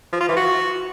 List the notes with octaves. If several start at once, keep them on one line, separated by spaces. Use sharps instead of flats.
F3
F4
E3
F#4